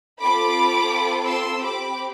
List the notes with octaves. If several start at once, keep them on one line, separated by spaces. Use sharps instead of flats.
C4 F4 A4 B5 D6
C6 E6
C4 G4 B5 D6